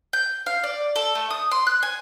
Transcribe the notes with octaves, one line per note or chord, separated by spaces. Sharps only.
G6
F5
D5
A4
A3
D#6
C6
F#6
G#5